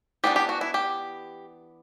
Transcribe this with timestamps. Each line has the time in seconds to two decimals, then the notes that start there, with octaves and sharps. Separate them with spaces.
0.24 E3 B3 D4 G4
0.36 G4
0.49 F#4
0.61 E4
0.74 G4